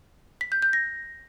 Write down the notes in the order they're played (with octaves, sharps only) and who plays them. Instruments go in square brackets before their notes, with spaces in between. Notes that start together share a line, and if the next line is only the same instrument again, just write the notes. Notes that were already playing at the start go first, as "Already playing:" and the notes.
[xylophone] B6
G6
G6
A#6